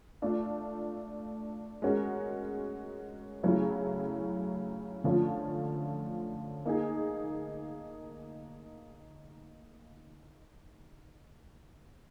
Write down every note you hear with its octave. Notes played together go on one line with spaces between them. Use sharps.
A3 D4 F4
G#3 C#4 F#4 A#4
C#3 F#3 A3 C#4 E4
D3 F3 A3 C#4 F4
A#3 D#4 G#4